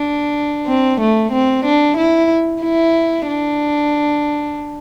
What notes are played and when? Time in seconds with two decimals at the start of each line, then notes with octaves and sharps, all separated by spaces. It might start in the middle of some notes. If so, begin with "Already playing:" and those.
Already playing: D4
0.67 C4
1.00 A3
1.32 C4
1.65 D4
1.97 E4
2.63 E4
3.28 D4